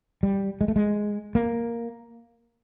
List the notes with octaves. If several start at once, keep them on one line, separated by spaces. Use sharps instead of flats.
G3
G#3
A3
G#3
A#3